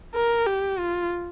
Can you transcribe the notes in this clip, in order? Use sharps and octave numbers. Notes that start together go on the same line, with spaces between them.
A#4
G4
F4